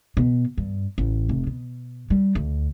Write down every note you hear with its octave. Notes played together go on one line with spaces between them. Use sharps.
B2
G2
A1
F1
B2
G3
D2